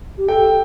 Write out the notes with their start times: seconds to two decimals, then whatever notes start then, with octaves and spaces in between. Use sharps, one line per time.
0.18 G4
0.28 A4 G5